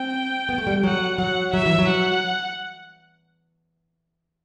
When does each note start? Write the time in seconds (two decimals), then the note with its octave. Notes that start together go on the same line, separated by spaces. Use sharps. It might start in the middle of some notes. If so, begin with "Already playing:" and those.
Already playing: C4 G5
0.49 B3
0.58 A3
0.67 G3
0.83 F#3 F#5
1.18 F#3 F#5
1.53 F#3 E5
1.66 E3
1.78 F#3
1.88 F#5